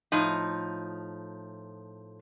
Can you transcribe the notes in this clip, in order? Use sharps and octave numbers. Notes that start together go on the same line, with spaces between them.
A2 F3 D#4